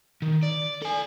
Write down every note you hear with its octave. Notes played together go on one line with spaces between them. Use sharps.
D#3
D5
A4 G#5